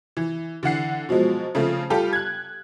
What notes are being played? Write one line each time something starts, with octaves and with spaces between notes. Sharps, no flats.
E3
D3 E3 F#5 C7
B2 F3 F#3 G#3
C#3 F3 A3 C4
G3 F4 G4 A4
F#6 G#6